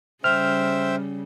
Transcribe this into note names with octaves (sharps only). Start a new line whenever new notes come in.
C#3 G3 C5 E5 G5 F6